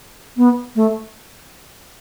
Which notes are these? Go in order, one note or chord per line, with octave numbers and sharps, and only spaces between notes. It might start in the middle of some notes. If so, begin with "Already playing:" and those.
B3
A3